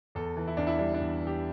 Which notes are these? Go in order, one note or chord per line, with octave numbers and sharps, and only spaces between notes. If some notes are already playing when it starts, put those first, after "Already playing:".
E2 A4
E3
E4
E2 D4
E4
G3 D4
D4
E2
E3
G4